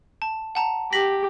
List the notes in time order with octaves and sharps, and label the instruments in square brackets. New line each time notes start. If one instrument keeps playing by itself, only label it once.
[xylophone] A5
F#5 A5 A#5
[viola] G4 [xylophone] A#6 B6 F#7